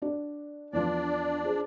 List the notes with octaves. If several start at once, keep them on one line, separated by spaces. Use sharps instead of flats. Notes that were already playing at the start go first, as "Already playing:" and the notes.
D4 F#4 D5
E2 F3 D4 D5
F4 G#4 C5